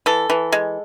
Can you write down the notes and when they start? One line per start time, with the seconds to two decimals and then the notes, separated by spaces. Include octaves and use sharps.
0.06 E3 A4
0.30 E3
0.52 G#3